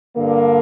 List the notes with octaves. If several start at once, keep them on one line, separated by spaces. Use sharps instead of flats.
G2 D3 A#3